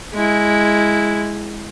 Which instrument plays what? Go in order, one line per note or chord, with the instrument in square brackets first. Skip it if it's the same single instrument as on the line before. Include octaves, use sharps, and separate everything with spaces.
[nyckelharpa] G#3 E4